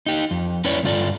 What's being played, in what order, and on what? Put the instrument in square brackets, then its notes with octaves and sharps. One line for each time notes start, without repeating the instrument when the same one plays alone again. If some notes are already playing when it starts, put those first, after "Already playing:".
[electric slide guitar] D#4 G4
F2
C#4 E4 B4 C#5 D5
G2 D3 F4 A4 D5